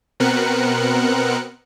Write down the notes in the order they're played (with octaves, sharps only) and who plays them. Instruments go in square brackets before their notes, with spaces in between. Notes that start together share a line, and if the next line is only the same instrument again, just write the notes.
[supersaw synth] B2 B3 C4 A#4 F#6 C#7